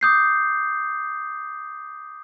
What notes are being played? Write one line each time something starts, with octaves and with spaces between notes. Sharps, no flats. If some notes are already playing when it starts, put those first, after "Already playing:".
D6 D#6 G6 C7